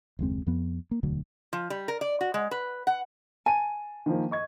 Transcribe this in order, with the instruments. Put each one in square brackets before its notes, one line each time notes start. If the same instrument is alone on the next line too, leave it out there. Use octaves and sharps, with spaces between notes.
[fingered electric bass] F#1 D#2 G#3 C4
F2 F3 B3
A#3
E1 D2 D3 F#3
[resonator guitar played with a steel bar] F3
G3
A#4
D5
F#4
G#3
B4
F#5
[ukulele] G#5 [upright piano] A5 D#7
[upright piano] D#3 F3 A#3
D#5 C#6 G#6